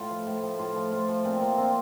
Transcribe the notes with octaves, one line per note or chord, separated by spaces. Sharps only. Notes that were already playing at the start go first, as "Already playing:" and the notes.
Already playing: A2 F4
F3
A2
F3
A2 F4
F3
A2 F4
F3 F4
A#2 C4
F3 A#3
A#2 C4